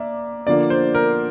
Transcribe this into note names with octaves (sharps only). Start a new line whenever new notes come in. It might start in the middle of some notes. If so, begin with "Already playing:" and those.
Already playing: A#3 D5 E5
D3 F3 A#3 D5
C5
A#4